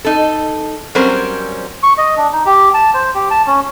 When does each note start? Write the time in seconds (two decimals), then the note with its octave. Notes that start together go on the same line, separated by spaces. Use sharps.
0.05 D#4 A4
0.95 F#3 G3 C4 C#4 A#4 C5
1.83 C#6
1.98 D#5
2.17 D4
2.33 D#4
2.46 G4
2.74 A5
2.94 C5
3.14 G4
3.30 A5
3.47 C#4